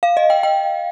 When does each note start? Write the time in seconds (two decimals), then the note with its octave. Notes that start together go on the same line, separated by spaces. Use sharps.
0.03 F5
0.17 D#5
0.30 G5
0.43 G5